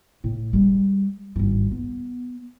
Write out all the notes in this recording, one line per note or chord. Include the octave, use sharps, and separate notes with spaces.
A2
G3 G#3
G#1 G2
B3